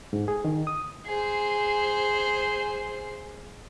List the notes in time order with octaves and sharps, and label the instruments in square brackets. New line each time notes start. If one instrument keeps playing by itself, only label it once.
[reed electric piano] G#2
G#4
D#3
D#6
[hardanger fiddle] G#4 C5